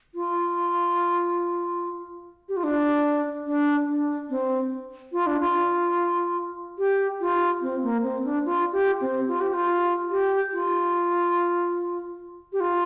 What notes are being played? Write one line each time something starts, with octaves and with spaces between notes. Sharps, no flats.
F4
G4
F4
D4
D4
D4
C4
F4
D4
F4
G4
F4
C4
A#3
C4
D4
F4
G4
C4
F4
G4
F4
G4
F4
G4
F4